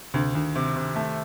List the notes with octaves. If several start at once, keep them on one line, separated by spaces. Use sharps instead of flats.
D2 C3
D2 D#3
C3
C3
A3